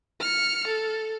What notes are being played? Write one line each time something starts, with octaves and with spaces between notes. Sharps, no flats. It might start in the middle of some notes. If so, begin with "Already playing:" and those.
F6 C#7
A4